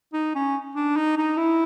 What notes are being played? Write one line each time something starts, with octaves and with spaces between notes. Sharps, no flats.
D#4
C#4
D4
D#4
D#4
E4